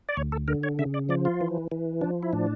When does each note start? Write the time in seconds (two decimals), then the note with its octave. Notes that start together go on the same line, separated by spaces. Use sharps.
0.09 D5
0.17 D2 C#5
0.32 A4
0.48 D3 A#4
0.63 C#5
0.79 C#3 E5
0.94 D5
1.09 F3 D5
1.25 F4
1.41 E3
1.72 E3
2.01 F3 D4
2.23 E4
2.33 A2 D4